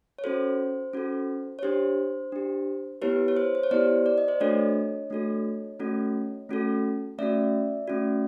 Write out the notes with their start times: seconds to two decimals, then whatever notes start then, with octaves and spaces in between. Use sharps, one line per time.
0.18 C#5
0.24 C#4 F#4 A4 C5
0.93 C#4 F#4 A4
1.59 C#5
1.63 D4 G4 C5
2.32 D4 G4
3.02 B3 E4 G4 B4 C#5
3.28 C#5
3.37 C5
3.55 C5
3.63 C#5
3.71 B3 E4 G4 C5 D5
4.06 D5
4.18 D#5
4.28 C5 D5
4.40 A3 D4 F#4 A4 C#5 D#5
5.10 A3 D4 F#4 A4
5.79 A3 C#4 F#4 A4
6.49 A3 C#4 F#4 A4
7.18 A3 C#4 F#4 D5 E5
7.88 A3 C#4 F#4